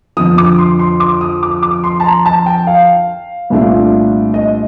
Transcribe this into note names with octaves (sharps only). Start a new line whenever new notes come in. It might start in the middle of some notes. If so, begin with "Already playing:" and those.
F2 D3 F3 D#6
D6
C6
C6
D6
D#6
D6
D6
C6
A5
A#5
A5
G5
F5
C2 A#2 A3 D4 F4
D#5